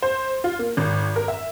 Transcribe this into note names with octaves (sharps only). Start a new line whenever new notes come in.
C5
F4
A#3
G#1
A#4
E5